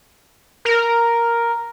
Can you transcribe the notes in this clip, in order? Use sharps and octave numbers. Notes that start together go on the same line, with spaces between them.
A#4